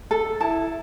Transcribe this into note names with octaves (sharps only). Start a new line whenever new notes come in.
A4
E4 A5